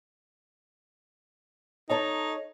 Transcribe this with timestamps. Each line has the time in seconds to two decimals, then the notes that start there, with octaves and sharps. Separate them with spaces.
1.89 D#4 A4 C#5 A#5